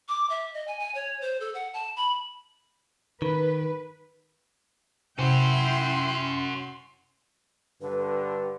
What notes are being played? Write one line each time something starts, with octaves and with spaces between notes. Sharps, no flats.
D6
E5
D#5
G#5
G#5
C#5
C5
A4
F#5
A5
B5
D#3 B4
C3 C#4 E4 F#4 G5 C6
G2 D3 B4